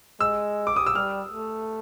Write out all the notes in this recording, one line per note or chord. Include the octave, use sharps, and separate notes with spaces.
G#3 E6
D6
D#6
E6
G3 F6
A3